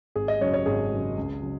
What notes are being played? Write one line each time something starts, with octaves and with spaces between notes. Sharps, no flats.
G#1 G#4
D#5
F#2 C#3 F#3 C#5
C#5
G#1 G#4
F#2 C#3 F#3
C#2
C#3 F#3